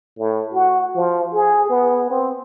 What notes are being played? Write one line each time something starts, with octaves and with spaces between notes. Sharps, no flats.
A2
F#4
F3
G#4
B3
C4